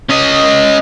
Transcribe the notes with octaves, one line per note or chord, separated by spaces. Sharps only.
C#4 D#5